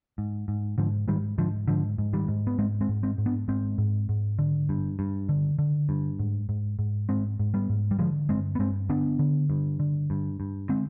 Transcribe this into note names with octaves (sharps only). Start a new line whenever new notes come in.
G#2
G#2
G#2 D3 F3
G#2 D#3 G3
G#2 D3 F3
G#2 D3 F3
G#2
D#3 G3
G#2
B3
G#2 G#3 C4
G#3 C4
G#2
G#3 C4
G#2
B3 D4
G#2 G#3 C4
G#2
G#2
D3
G2
G2
D3
D3
G2
G#2
G#2
G#2
G#2 G#3 C4
G#2
G3 B3
G#2
G3
D3 F3 G#3
G2 G#3 C4
B3
G2 G#3 C4
D3 B3 D4
D3
G2
D3
G2
G2
D3 G#3 C4